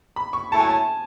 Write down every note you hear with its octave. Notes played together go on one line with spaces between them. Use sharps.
B5
C#6
F#3 A3 E4 A4 C#5 A5
G#5
A5